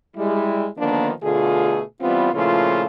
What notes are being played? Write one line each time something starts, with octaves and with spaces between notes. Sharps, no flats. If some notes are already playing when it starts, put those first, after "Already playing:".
G3 G#3 E4
D3 D#3 F3 A#3 B3 D4
B2 D3 A3 F4 G#4
E3 G3 B3 C4 F4
A#2 C#3 F3 A3 E4 F4